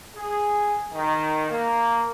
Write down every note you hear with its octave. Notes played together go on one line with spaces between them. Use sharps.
G#4
D#3
A#3